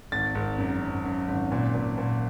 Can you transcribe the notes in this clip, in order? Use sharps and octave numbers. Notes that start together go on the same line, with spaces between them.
G#1 A6
G#1
F#2
F#2
F#2
G#1
A#2
A#2
A#2